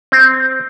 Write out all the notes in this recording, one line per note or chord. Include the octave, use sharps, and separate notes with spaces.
C4